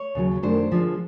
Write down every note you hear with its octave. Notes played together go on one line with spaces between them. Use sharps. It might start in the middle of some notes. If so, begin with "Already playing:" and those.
Already playing: C#5
D#2 C#3 F#3
F#2 D#3 F#3 A3 D4 C5
D3 F3 G#3